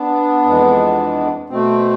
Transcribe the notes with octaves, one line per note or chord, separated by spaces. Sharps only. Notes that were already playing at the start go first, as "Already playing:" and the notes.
Already playing: B3 D4
F2 E3 G#3
B2 A3 C4